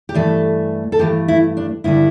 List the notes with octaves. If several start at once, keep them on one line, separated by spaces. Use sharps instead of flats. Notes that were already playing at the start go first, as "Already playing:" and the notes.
G4
G2 E3 A3 A4
A4
G2 E3 A3 G4
E4
D4
G2 D3 G3 B3 E4